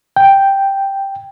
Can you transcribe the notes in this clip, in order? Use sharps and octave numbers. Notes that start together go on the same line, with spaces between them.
G5